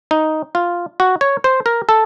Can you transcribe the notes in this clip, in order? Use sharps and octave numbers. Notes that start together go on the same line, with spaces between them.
D#4
F4
F#4
C#5
C5
A#4
A4